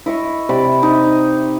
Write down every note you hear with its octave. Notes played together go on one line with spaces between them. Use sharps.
E4 D#5 C#6
C3 D5 B5
D#4